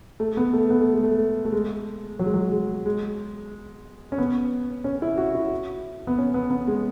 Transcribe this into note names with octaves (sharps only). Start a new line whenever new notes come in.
A3
B3
A3
B3
A3
G#3
A3
A3
G#3
F#3
G#3
F#3
G#3
G#3
C#4
B3
C#4
E4
F#4
E4
B3
C#4
B3
B3
G#3